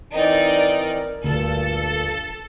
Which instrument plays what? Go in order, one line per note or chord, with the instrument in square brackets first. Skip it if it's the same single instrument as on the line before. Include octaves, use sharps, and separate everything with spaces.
[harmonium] E3 C4 D#5 [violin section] D#4 D5 [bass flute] A#4
[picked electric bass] D2 [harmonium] G2 A#2 [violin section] A4